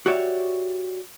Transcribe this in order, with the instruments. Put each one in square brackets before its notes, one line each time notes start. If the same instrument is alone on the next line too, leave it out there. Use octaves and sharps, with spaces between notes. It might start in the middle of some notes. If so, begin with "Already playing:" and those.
[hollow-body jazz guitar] F#4 G4 C#5 D5 E5